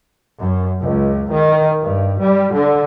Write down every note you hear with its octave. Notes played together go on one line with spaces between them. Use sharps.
F#2
C#2
D#3
G2
G3
D3